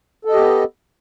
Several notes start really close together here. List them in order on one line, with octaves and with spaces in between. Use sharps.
A4 D#5 G4 B3